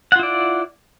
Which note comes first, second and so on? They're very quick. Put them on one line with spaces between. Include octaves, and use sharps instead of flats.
F#5 F4 E4 D5